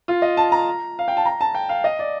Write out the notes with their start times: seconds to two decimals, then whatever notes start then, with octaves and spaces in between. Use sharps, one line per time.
0.08 F4
0.22 D#5
0.37 A5
0.52 A#5
0.99 F5
1.08 G5
1.17 A5
1.25 A#5
1.41 A5
1.55 G5
1.69 F5
1.84 D#5
1.99 D5